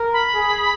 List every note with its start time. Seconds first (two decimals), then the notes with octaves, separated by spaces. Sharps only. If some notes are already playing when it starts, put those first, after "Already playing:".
Already playing: A#4
0.13 B5
0.35 G#4